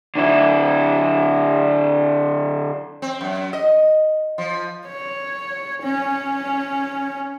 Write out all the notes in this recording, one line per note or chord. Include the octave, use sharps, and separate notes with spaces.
D3 E4
C4
F#2
D#5
F3
C#5
C#4